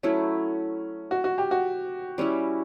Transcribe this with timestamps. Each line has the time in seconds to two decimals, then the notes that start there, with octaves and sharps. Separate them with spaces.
0.03 F#3 A3 C#4 E4
1.11 F#4
1.24 F#4
1.38 G4
1.51 F#4
2.18 G3 C#4 E4